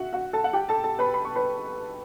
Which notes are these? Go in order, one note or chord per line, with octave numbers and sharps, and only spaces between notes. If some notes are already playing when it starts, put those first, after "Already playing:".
Already playing: F#4 E5 F#5
F#4 F#5
A4 A5
F#5
G4 G5
A4 A5
A4 A5
B4 B5
B5
C#6
B4 B5